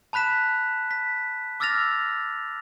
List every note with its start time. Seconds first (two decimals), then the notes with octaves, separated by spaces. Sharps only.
0.13 A5 B5 F#6 B6 E7
0.91 B6
1.60 D6 E6 F6 A6 A#6 F7